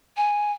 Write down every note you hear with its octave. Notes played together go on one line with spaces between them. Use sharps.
G#5